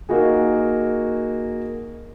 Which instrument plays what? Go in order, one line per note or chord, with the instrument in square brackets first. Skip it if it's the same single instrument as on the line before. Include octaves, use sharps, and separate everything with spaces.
[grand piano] A#3 D#4 F#4 G#4